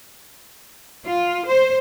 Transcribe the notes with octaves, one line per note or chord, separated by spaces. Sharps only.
F4
C5